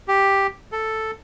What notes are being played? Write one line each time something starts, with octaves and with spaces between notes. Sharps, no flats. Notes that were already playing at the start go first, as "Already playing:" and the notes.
G4
A4